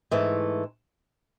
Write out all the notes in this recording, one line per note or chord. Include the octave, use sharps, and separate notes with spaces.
G#2 E3 A3